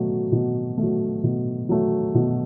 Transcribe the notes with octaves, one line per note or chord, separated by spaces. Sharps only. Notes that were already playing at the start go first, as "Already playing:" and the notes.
Already playing: B2 F#3 A3
B2
A3
F#3
B2
F#3 A3
B2